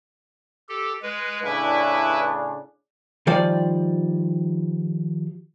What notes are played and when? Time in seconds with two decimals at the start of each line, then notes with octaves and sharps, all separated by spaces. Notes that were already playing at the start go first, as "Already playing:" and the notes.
0.69 G4 A4
1.02 G#3 B4
1.44 A2 C#3 D4 E4 B4 E5
3.27 D#3 F3 G3 F4 D5